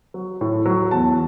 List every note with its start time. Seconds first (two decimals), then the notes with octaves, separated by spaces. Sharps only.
0.14 F#3
0.41 A2
0.66 F#3
0.91 E2 A5